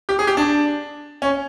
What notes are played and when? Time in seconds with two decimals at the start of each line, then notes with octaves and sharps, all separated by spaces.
0.09 G4
0.19 G#4
0.27 G4
0.37 D4
1.22 C#4